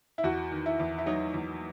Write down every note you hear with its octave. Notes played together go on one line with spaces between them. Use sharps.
E4
E2 F#4
D#3
E4
E2
E4
F#3 D#4
E2